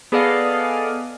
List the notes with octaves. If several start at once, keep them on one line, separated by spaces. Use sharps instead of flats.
B3 G#4 A4 D5 D#5 F5